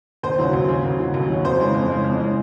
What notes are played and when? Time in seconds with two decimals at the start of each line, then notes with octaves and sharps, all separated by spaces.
0.23 D#2 C5
0.39 C#3 F#3
0.53 D#2
0.69 C#3 F#3
0.85 D#2
0.99 C#3 F#3
1.14 D#2
1.30 C#3 F#3
1.45 F2 C5
1.60 C#3 E3 G#3
1.75 F2
1.90 C#3 E3 G#3
2.04 F2
2.20 C#3 E3 G#3